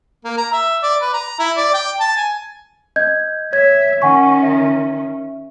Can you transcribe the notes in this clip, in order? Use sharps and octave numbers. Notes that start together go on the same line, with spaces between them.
A#3
A#5
E5
D5
B4
A#5
E4
D5
G5
A5
G#5
D#5 G6 G#6
C#5 E5 G#6
D#3 C#4 F#5 G#5 C#6
E5